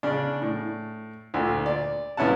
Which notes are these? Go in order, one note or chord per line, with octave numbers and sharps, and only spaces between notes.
C#3 D4
A2
D2 A#2 D3
D5
C2 B3 C#4 E4 F#5 A5